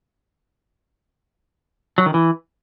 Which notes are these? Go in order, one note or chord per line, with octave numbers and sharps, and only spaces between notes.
F#3
D#3
E3